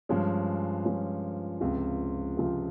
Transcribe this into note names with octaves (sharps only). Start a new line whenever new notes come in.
G2 F3 G#3 C#4
G2 F3 G#3 C#4
C#2 C3 F3 C4 F4
C#2 C3 F3 C4 F4